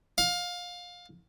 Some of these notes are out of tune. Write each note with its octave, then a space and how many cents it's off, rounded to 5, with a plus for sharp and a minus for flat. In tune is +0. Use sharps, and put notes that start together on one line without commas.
F5 +20